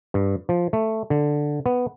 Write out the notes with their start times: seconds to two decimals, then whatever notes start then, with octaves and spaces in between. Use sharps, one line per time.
0.14 G2
0.49 F3
0.73 A3
1.10 D3
1.66 B3